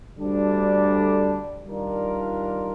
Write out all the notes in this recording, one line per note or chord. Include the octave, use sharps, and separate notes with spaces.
D2 D3 G3 D4
D#3 G3 D4 F4 A#4